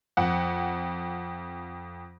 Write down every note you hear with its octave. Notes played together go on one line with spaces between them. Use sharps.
F2 F#5